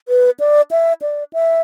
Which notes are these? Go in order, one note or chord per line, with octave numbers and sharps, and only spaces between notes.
B4
D5
E5
D5
E5